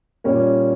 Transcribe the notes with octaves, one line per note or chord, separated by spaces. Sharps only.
A#2 G3 A#3 C#4 C#5